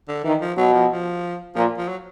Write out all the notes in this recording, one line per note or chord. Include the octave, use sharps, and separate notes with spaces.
D3
D#3 E3
F3
B2 F#3
F3
F3
A#2 F3
F3
F#3